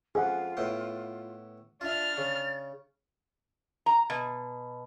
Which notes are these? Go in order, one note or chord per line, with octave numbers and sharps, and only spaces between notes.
F2 F4 G#4 F#5
A2 B3 G5
D4 F4 E5 F6 A6
C#3
A#5
B2